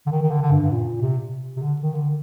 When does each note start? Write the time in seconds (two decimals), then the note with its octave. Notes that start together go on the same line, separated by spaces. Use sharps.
0.06 D3
0.12 D#3
0.22 D#3
0.31 D3
0.42 D3
0.52 G2
0.62 G2
0.72 A#2
1.02 C3
1.57 C3
1.62 D3
1.82 D#3
1.95 D3